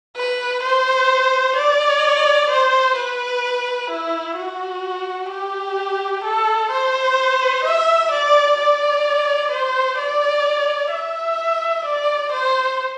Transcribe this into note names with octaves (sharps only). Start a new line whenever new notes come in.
B4
C5
D5
C5
B4
E4
F#4
G4
A4
C5
E5
D5
D5
C5
D5
E5
D5
C5